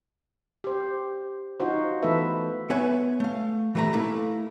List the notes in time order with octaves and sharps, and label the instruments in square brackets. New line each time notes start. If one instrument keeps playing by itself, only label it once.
[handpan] G4 C5
D#4 F4 F#4 C5
E3 A3 B3 A4 B4 E5
[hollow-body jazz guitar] B3 B4 C#5 E5 G#5
A3 F5
E3 G3 A3 E5 A#5 B5
A3 A#3 E4